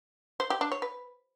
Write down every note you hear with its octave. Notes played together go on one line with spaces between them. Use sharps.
C5
G4
D4
C#5
B4